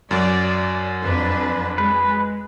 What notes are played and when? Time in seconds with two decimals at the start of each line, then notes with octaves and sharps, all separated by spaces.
0.11 F#2 F#3 D5
1.03 F2 D4 B4
1.78 G#3 B4